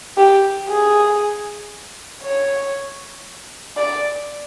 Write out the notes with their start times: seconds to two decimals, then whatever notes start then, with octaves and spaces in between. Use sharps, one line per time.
0.17 G4
0.68 G#4
2.23 C#5
3.77 D5